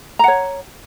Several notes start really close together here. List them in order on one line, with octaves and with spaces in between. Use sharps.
A#5 F#5 C#5